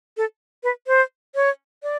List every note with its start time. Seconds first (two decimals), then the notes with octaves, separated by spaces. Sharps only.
0.17 A4
0.63 B4
0.87 C5
1.35 C#5
1.83 D5